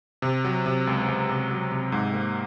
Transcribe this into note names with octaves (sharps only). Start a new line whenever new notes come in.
C3
F#3
C3
C#2
C#2
C3
F#3
C3
G#2
A#3